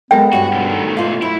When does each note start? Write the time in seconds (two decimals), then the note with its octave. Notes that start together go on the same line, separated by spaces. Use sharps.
0.11 G#3 B3 A4 A#4 G5
0.33 G2 C#4 F#4
0.53 B2 D3
0.69 D#3 A3
0.97 B2 A3 D#4 F4 F5
1.22 F#2 E4